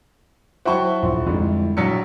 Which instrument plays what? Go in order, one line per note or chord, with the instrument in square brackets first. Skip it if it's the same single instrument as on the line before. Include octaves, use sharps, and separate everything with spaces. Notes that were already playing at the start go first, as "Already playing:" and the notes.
[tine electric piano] F#3 E4 C5 [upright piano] F#4 C#6 [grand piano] E5 G5 A5
[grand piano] D#1 A#1 C6
[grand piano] F2 G#2 D3 [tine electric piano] G3 E4
[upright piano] A#1 F#3 [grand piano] B6 C#7